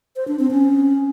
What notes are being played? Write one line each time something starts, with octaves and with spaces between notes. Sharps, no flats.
C5
D4
C4
C#4